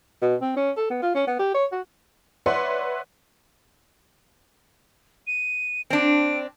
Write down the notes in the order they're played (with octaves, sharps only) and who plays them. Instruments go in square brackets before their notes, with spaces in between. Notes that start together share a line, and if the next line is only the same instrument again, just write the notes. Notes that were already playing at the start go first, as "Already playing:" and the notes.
[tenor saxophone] B2
C4
C#4
A4
B3
F4
C#4
B3
G4
C#5
F#4
[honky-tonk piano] B4 C#5 D5 E5 F#5 C6
[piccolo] D#7
[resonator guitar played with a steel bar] C4 D4 [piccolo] D7